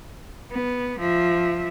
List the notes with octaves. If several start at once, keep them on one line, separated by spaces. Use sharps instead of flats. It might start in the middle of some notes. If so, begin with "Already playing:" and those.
B3
F3 E5